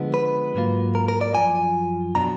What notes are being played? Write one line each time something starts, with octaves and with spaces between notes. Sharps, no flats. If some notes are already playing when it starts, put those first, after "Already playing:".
Already playing: D3 F3 G#3 B3
B4
G#2 F#3 A#3 F4
A#4
A#4
D5
F#2 F3 A#3 F4 G#5
B2 F#3 D4 A#5